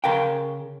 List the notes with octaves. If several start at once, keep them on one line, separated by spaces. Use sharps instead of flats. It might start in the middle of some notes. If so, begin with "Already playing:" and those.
C#3 A#4 F5 G5